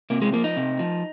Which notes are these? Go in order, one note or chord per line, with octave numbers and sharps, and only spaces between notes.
C3 A#3
G#3
F3 A#3
D#4
C3
F3